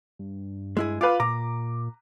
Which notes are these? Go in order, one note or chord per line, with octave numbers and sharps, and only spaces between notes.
G2
G#3 E4 G#4
F4 B4 F5 D6
A#2 A#5 D6